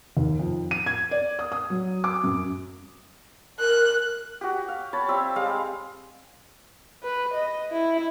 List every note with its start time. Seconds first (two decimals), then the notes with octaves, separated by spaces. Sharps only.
0.17 D#2
0.39 F2
0.71 D#7
0.86 G#6
1.11 D5
1.39 D#6
1.52 D#6
1.70 F#3
2.04 D6
2.24 F#2
3.60 A#4 F#6
4.41 F#4 G4
4.68 F5
4.93 C#5 A5 B5
5.08 G3 C4 E5
5.36 G3 G#3 F5
7.03 B4
7.34 D#5
7.71 E4